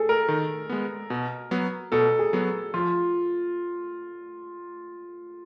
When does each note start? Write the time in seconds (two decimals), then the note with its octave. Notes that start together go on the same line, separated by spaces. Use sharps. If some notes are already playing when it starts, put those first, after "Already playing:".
Already playing: G#4 A4
0.09 A#4
0.29 D#3
0.69 G#3 B3
1.10 B2
1.51 F#3 B3
1.92 B2 A4
2.19 G#4
2.33 F#3 B3
2.74 F3 F4